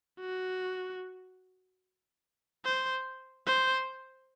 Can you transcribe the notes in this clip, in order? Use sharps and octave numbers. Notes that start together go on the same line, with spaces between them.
F#4
C5
C5